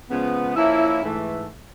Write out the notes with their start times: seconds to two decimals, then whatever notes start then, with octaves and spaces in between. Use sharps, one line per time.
0.10 C#3 F3 G#3 B3
0.56 F3 A#3 C#4 E4
1.02 G#2 E3 A3